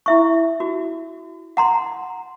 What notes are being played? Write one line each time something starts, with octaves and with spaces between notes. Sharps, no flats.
E4 E5 C#6
F#4
F#5 A#5 C6